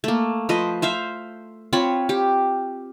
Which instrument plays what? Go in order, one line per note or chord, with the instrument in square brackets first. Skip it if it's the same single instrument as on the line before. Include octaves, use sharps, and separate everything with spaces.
[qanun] A3 A#3
F3 B4 C5 D#5
C5 E5 F5
C4 F4 C#5 B5
G4